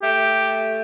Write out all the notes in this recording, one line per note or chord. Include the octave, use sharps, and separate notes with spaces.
A3 G4